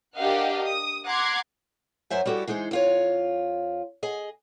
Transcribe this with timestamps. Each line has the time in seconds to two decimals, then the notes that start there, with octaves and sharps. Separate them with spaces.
0.17 D4 G4 A#4 D#5 F5 F#5
0.65 D#6
1.07 F#5 A#5 C6 D6 G#6 C7
2.10 F#2 F#3 C5 E5 G#5
2.25 G3 E4 F#4 G4 A4
2.47 E3 G#3 D#4 G#4 C5
2.71 F2 F4 C#5
4.03 G#4 D#5 G#5